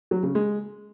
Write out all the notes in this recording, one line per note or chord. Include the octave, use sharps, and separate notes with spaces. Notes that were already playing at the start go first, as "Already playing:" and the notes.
F#3
C#3
G#3